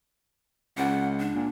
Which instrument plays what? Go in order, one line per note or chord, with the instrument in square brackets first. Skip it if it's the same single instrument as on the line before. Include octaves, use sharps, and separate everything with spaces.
[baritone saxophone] C#2 [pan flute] F#5
[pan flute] D4
[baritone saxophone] A#2